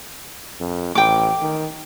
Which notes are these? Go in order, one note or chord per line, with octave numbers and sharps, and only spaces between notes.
F2
A1 G5 D6
D#3